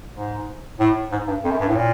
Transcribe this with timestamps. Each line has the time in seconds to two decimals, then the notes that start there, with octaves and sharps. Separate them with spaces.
0.16 G#2
0.80 A2
1.12 G#2
1.28 G2
1.44 F2
1.51 F#2
1.60 G2
1.68 A2
1.76 A#2